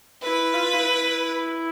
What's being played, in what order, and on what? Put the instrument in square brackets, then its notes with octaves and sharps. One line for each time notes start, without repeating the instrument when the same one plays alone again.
[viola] E4 [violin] B4
[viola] F4
E4